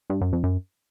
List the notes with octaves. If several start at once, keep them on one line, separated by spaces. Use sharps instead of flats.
G2
F#2
F2
F#2